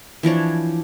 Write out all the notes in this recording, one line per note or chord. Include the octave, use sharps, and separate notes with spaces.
E3 F3 D4 C#5